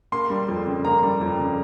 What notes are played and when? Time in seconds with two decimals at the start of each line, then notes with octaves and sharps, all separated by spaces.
0.12 A#3 C6
0.30 G3
0.49 F2
0.67 C#3
0.85 A#3 A#5
1.03 G3
1.21 F2
1.40 C#3